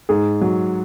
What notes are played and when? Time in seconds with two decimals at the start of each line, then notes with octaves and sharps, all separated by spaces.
0.09 G#2 G#4
0.41 F#3